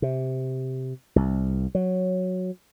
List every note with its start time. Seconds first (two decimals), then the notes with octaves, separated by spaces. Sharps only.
0.02 C3
1.16 C2
1.75 F#3